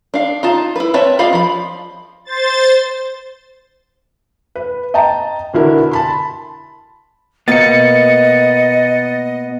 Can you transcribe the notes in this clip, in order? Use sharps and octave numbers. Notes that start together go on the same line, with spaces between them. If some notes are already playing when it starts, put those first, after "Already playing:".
D4 F5
D#4 F4 A5
E4 B4
C4 B4 C#5 E5 A5
F4 D5 D#5 F5 B5
F3 B5
C5 A6
B4
D#5 G5 A5 A#5
B2 D3 E4 A#4
A5 B5 C6
B2 A#3 B3 D#5 A6 C#7